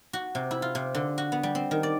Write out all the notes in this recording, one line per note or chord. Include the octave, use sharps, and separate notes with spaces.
F#4
C3
E4
F4
C3
D3
F#4
B3
G3
C4
D#3
D5